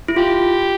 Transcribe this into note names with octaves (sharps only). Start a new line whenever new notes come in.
E4
F4 G4